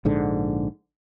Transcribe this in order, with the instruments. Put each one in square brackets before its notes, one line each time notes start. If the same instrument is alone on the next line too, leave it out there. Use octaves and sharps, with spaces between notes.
[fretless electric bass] A#1 G#2 D3